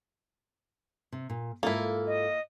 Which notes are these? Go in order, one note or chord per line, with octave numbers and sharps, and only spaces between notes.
C3
A#2
G#2 A#3 E4 F4 A4
D#5